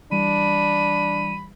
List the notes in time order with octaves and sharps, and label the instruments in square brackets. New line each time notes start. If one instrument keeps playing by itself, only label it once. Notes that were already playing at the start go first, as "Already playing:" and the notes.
[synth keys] E3 G3 [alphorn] D4 [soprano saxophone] B5 [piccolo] D#7